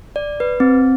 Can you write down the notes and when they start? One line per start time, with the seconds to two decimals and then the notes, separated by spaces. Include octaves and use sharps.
0.16 D5
0.40 B4
0.60 C4